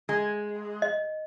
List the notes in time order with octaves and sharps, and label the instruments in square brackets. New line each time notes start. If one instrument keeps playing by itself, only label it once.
[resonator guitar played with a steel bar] G#3
[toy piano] D#5